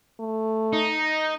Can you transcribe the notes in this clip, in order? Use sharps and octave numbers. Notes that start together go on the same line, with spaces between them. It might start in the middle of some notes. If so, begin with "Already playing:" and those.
A3
D#4